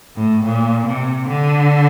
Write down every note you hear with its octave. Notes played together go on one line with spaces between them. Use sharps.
A2
A#2
C3
D3